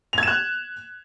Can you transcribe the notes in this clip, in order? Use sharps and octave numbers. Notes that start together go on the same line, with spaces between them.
F#6 G#6 E7 F7